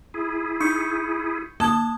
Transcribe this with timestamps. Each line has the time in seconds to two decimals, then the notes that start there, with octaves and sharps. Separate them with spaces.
0.14 E4 G#4
0.61 D#4 C#6 G6 C#7
1.60 A#3 A5 D#6 G#6